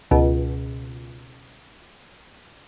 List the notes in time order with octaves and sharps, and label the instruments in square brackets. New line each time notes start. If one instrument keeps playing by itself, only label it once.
[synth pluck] C#2 B2